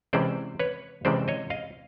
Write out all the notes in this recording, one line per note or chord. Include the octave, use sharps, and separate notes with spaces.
C3 E3 G#3 C#4 C5 D5
B4 C#5
C3 E3 G#3 C#4 C5 D5
C#5 D#5
D#5 F5